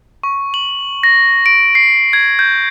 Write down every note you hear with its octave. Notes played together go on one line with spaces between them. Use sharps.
C#6
F#7
A#6
D7
C7
G#6
G6